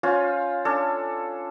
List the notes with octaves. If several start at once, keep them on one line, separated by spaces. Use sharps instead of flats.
C#4 F4 C5 F5
C#4 D4 A4